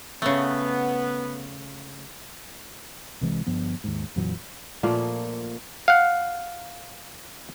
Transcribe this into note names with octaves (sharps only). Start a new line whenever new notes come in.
C#3 A3 B3
C2 C3 E3 G#3
G1 G2 F3 B3
D#2 G#2
F2 A#2 E3 F#3
A#2 F3 A3 A#3
F5 F#5